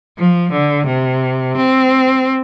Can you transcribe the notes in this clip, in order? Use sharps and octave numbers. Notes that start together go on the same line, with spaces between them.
F3
D3
C3
C4